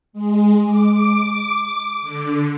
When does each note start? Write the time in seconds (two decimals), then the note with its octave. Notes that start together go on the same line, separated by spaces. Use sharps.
0.13 G#3
0.67 D6
2.02 D3